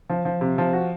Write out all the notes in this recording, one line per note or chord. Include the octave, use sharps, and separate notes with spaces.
F3
F3
C3
F3
F#4